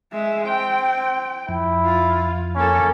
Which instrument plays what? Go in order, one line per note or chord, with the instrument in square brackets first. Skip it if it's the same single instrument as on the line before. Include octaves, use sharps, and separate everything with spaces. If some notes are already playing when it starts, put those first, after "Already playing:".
[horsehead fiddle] G#3 E5
[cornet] C4 [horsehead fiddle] G5
[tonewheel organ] F2 [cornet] E4
[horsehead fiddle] F4
[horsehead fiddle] A#3 A4 [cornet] C#4